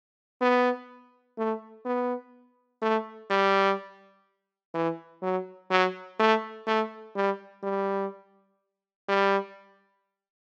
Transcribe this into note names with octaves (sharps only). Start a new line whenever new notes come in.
B3
A3
B3
A3
G3
E3
F#3
F#3
A3
A3
G3
G3
G3